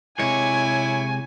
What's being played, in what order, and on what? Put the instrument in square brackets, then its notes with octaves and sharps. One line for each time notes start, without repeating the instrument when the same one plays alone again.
[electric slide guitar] C3 G#3 [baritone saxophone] E4 [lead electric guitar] C#5 [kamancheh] G#5